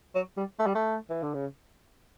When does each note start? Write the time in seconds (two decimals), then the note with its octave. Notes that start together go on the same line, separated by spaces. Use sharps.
0.15 F#3
0.37 G3
0.59 A3
0.67 G3
0.75 A3
1.10 E3
1.23 D3
1.34 C#3